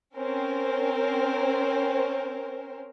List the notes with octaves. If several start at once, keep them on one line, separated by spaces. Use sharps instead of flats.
C4 C#4 A#4 C5